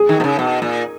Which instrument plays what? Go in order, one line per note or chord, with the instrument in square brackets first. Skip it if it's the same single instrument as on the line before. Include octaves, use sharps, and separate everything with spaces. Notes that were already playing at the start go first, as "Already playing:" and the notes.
Already playing: [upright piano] G#4
[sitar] D#3
B2
C#3
B2
A#2